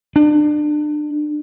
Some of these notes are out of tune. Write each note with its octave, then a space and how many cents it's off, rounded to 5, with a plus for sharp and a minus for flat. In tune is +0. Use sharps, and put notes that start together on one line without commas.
D4 +30